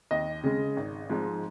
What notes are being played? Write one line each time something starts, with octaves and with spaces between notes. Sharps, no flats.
D#2 D#5
C#3 G#3
G#1
G#2 F3 G#3